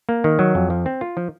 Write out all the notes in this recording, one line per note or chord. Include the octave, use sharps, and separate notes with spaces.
A#3
D#3
F#3
F2
F3
C4
F4
F3